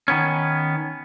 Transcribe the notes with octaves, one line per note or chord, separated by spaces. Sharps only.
D#3 B3 C#4